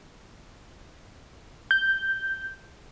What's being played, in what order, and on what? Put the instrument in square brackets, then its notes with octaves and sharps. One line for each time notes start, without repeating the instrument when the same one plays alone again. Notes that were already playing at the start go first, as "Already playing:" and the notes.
[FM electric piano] G6